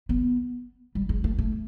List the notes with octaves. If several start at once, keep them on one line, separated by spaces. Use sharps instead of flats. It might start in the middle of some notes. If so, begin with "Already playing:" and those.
B3
G3
G#3
A3
A3